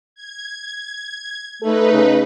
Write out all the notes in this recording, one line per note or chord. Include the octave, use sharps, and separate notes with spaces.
G#6
A3 D#4 A4 B4
C#3